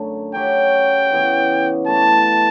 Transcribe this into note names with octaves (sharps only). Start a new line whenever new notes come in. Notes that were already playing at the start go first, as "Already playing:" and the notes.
Already playing: F#2 D3 A3
F#3 C#4 G4 C#5 G5
C#3 E3 B3
A3 E4 G4 D5 A5